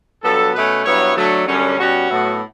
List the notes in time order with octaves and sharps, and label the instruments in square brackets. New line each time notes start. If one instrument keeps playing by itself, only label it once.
[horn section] G2 F#3 B3 A4
B2 A3 C#4 B4
G2 F#3 B3 E4 C#5
D3 F#3 A3
F#2 D3 G3 C#4
B2 G3 C#4 F#4
A2 F#3 B3 E4